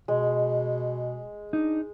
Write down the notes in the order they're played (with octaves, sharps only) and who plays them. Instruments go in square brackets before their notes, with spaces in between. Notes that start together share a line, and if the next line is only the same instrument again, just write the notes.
[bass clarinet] B2 [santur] G#3
[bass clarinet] D4 [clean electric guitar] D#4